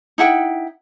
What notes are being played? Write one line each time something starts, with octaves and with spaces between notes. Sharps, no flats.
D#4 E4 F#5 G5